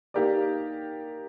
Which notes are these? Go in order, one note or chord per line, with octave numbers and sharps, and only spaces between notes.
A#3 D#4 G4 A#4 D5